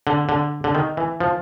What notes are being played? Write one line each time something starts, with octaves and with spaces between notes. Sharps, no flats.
D3
D3
D3
D#3
E3
F3